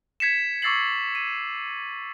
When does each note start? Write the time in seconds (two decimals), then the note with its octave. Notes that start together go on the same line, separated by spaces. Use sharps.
0.20 G#6 B6 C#7 E7
0.62 C#6 D6 E6 A6 C7 F#7
1.15 D#7